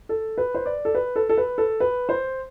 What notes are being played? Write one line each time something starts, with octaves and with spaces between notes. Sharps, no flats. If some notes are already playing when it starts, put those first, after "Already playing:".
A4
B4
C5
D5
A4
B4
A4
A4
B4
A4
B4
C5